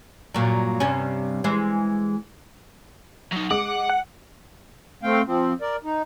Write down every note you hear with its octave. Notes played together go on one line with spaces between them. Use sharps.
G2 A#2 F#3
G2 C3 C#4
E3 G#3 C5
F#3 D#4
G#3 F#5 D6 D7
F#5
A3 C4 F5 G5
F3 C4
A#4 D5
D#4